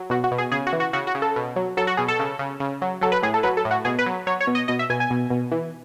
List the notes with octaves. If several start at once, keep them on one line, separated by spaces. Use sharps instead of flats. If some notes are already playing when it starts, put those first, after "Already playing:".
Already playing: F#3
B2 F#4
F#4
B2
G#4
C#3 G#4
F#4
E3
F#4
C#3 F#4
F#4
C#3
A4
B2
F#3
F#3 A4
F#4
B2 G#4
A4
C#3
C#3
C#3
F#3
F#3 A4
B4
A2 G#4
A4
F#3 B4
A4
A2
F#4
B2 G#4
B4
F#3
F#3 C#5
C#5
B2
D#5
B2 D#5
E5
B2 G#5
G#5
B2
B2
E3